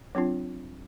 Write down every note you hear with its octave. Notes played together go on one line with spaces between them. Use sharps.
F#3 C4 D4 F4